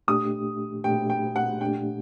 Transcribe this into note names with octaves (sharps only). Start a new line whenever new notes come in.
A#2 A3 D4 G4 D#6
A#2 A3 D4 G4 G5
G5
F#5
A#2 A3 D4 G4 G5